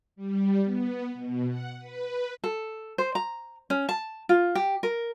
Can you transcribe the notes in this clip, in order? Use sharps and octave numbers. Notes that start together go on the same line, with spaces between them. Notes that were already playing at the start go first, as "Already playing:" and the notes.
G3
B3
B2
F#5
B4
A4
C5
A#5
C#4
A5
F4
G4
A#4